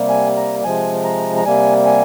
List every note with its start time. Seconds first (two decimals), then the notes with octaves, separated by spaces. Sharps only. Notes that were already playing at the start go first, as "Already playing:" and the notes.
Already playing: C3 G3 A#3
0.09 G#5
0.37 A#5
0.64 C3 F3 G#3 G#5
1.04 A#5
1.36 A#5
1.45 C3 G3 A#3 G#5
1.86 G#5